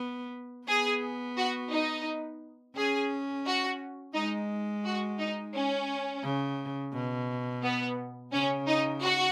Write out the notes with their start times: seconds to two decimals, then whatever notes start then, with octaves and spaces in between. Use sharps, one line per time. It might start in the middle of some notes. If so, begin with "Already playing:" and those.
Already playing: B3
0.68 B3 G#4
1.37 F#4
1.71 D#4
2.76 C#4 G#4
3.46 F#4
4.15 G#3 D#4
4.84 F#4
5.19 D#4
5.55 C#4
6.23 C#3
6.94 B2
7.63 B3
8.33 C#3 C#4
8.68 D#4
9.02 F#4